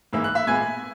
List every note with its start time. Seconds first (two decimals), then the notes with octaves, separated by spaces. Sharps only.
0.13 G#2 E3 A#3 E6
0.24 F#6
0.35 E5 E6
0.47 A#2 G#3 B3 G#5 G#6